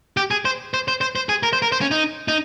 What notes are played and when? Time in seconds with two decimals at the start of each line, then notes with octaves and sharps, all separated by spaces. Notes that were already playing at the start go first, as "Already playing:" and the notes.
0.17 G4
0.31 G#4
0.45 C5
0.74 C5
0.88 C5
1.01 C5
1.15 C5
1.29 G#4
1.43 A#4
1.53 C5
1.62 A#4
1.72 C5
1.81 C#4
1.91 D#4
2.28 D#4